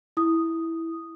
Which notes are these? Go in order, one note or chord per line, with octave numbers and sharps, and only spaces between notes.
E4 D#6